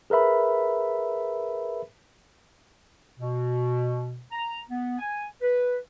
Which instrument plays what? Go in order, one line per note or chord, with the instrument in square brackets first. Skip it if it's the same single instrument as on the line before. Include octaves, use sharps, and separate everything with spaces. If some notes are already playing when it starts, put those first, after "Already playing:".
[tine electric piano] G#4 A#4 B4 E5 B5
[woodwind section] B2
A#5
B3
G#5
B4